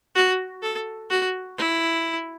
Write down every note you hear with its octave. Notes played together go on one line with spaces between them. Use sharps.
F#4
A4
F#4
E4